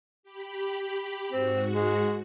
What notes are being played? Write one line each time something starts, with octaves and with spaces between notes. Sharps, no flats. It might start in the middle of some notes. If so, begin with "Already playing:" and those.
G4 B5
G#2 C4 F#4
G#3